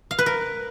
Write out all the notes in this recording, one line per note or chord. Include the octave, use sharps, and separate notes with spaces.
F5
B4
A#4